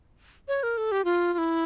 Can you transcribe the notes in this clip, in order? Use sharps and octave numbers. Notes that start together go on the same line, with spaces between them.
C#5
A#4
A4
G4
F4
F4
E4